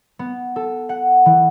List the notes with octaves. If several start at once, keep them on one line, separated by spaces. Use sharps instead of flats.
B3
A4
F#5
E3